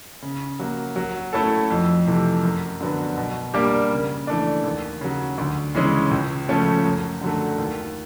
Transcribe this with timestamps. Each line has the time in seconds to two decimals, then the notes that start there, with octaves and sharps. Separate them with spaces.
0.22 C#3
0.59 F#3 A#3
0.96 F#3
1.33 A3 C#4 E4 A4
1.71 F2
2.07 C3 E3 A3
2.43 F#2
2.81 D3 F#3 B3
3.18 B2
3.54 G3 A#3 D4 G4
3.91 C#3
4.27 E3 A3 D4
4.64 D#2
5.01 C#3 F#3
5.38 D2
5.75 C#3 E3 G#3 C#4
6.11 C#2
6.48 C#3 F3 A3 C#4
6.85 F#2
7.21 D3 F#3 A3
7.59 D#2